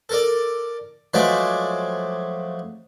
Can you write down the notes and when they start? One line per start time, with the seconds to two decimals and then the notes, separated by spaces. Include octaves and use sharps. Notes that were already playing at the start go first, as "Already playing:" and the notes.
0.09 A4 A#4 D5
1.14 F3 F#3 G#3 A3 B4 D5